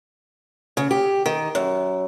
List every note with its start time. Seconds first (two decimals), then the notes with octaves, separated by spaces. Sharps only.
0.77 C#3
0.91 G4
1.26 D#3
1.55 F#2